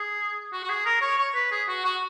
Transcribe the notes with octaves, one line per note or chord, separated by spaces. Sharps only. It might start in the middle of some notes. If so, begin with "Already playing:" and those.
Already playing: G#4
F#4
F#4
G#4
A#4
C#5
C#5
B4
G#4
F#4
F#4